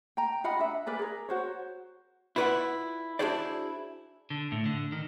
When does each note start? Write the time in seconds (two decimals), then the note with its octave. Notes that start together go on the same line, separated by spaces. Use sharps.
0.17 G5 A#5
0.44 F4 D#5 F#5 B5
0.59 D4 E5
0.86 A#4 B4 D5 G#5
0.99 G#4 A#4
1.29 F#4 C5 C#5
2.36 E4 F4 B4 C#5 D5 F#5
3.19 D4 E4 F#4 G#4 C5 D5
4.30 D3
4.52 A2
4.66 D3
4.92 D#3